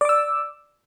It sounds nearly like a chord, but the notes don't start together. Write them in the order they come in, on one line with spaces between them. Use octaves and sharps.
D5 D6 E6